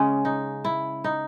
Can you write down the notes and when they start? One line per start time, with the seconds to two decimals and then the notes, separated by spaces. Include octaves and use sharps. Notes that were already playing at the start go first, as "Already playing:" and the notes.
Already playing: C#3 G#3 C#4
0.25 D#4
0.64 E4
1.04 D#4